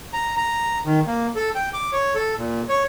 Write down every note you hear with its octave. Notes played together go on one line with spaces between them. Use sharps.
A#5
A#5
D#3
A#3
A4
G5
D6
C#5
A4
A#2
C#5